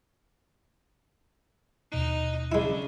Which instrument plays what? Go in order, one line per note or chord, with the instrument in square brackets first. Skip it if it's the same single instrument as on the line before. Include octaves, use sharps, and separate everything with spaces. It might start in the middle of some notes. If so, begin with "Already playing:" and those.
[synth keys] D#2 B2 F#6 [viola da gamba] D#4
[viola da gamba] C#3 D4 [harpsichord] G#3 E4